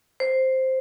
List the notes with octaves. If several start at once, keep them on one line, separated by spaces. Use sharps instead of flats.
C5